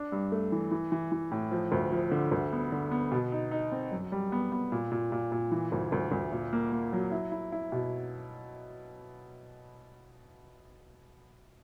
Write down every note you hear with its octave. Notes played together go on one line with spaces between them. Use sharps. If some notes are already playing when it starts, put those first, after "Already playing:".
Already playing: D4
G2
A3
E3
E3
E3
E3
A2
F3
D2
F3
D3
D2
B3
D3
B3
B2
D#4
D#4
C4
F#2
G3
B3
B3
A#2
A#2
A#2
A#2
E3
D2
D2
D2
A#2
A#3
A#3
F#3
E4
E4
E4
B2